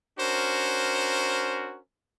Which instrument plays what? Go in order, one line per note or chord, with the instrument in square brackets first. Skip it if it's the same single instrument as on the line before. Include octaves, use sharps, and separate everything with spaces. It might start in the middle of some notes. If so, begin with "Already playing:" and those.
[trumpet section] C#4 D4 F#4 A#4 C5